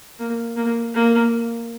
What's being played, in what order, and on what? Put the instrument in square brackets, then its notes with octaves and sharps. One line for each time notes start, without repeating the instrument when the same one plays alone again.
[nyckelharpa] A#3
A#3
A#3